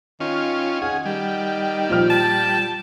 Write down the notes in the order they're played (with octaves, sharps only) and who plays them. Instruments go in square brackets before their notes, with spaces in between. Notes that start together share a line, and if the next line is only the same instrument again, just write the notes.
[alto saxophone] D#3 [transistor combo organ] C#4 F4
[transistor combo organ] G#4 [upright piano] F#5
[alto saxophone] D#3 [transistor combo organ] G3
[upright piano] A#2 F3 F6
[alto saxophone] A5